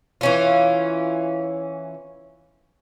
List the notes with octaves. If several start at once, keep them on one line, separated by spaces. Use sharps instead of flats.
E3 C#4 F4